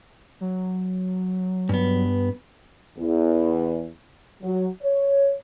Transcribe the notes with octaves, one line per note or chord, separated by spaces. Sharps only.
F#3
G2 B3
E2
F#3
C#5